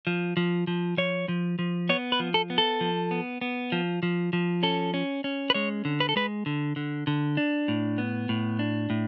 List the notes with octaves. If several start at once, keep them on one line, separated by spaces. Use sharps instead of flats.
F3
F3
F3
F3 C#5
F3
F3
B3 C#5
B4
F3
A4
B3
A4
F3
B3
B3
F3
F3
F3
C#4 A4
C#4
C#4
B4
G#3 C#5
D3
B4
A4
G#3 B4
D3
D3
D3
D4
A2
B3
A2
D4
A2